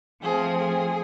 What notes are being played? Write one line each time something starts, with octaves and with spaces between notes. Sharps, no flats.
F3 A3 C4 G#4
G#4